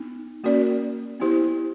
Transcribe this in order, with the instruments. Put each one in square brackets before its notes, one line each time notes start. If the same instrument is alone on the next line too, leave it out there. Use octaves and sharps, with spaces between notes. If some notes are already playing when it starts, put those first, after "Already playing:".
Already playing: [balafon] B3 D#4
A#3 C#4 F#4 A#4 D5
B3 E4 G4 C5